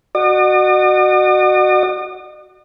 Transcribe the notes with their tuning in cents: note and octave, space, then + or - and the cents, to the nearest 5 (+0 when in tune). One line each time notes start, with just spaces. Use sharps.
F#4 +0 D#5 -45